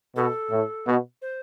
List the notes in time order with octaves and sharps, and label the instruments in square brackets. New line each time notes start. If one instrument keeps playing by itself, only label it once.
[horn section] B2 [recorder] A4
[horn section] A2
B2
[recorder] C5